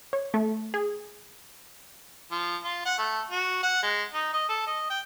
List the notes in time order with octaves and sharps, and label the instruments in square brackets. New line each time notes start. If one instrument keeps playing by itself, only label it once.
[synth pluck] C#5
A3
G#4
[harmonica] F3
F4
F#5
A3
F#4
F#5
G#3
D#4
D#5
A4
D#5
G5